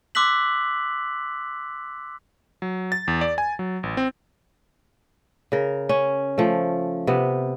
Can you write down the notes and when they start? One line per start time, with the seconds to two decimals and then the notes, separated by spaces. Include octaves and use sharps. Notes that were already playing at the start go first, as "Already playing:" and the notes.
0.15 C6 D6 E6 F#6 B6 F#7
2.62 F#3
2.92 A6
3.08 E2
3.21 D5
3.38 G#5
3.59 F#3
3.83 A1
3.97 C4
5.52 C#3 A#4
5.89 C#4
6.38 F3 A3
7.07 C3 B3